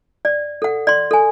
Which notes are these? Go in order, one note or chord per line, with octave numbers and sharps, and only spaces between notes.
D5
A4 F#5
D5 C6
A4 G#5